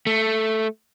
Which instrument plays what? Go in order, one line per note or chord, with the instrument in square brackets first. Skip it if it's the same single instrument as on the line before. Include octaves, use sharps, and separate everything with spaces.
[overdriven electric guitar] A3